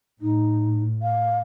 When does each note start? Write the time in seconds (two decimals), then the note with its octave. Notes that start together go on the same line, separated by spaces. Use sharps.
0.21 A2 D#4
1.02 F5